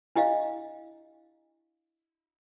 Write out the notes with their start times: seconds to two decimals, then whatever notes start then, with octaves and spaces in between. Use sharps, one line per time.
0.16 D4 E4 G4 D#5 F5